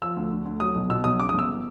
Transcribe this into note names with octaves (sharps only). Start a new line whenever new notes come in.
F3 E6
D2
D3
D2
F#3 D#6
B1
B2 E6
B1 D#6
C#3 D6
D#6
G1 E6